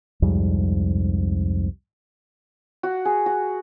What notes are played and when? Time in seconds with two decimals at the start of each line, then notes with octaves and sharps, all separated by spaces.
0.22 C2 F2 G#2 G3
2.83 F#4
3.05 G#4
3.26 F#4